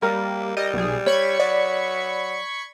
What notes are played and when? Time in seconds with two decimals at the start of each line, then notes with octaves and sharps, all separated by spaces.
0.02 G3 A#3 A#4
0.57 G3 D#5
0.73 B1 G#4
1.06 C#5 B5 C#6 G#6
1.40 F#3 D5